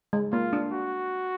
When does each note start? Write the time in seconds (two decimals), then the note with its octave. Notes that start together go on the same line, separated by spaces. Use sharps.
0.13 G#3
0.32 A#3 F4
0.53 D4
0.72 F#4